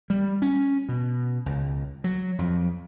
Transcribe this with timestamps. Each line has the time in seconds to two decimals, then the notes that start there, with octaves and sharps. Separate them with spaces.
0.10 G3
0.42 C#4
0.89 B2
1.46 C#2
2.04 F#3
2.39 F2